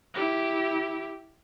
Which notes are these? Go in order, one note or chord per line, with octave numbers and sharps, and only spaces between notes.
E4 G4